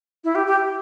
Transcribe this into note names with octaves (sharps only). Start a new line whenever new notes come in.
E4
G4
G4